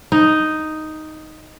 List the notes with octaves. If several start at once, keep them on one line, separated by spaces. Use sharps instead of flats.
D#4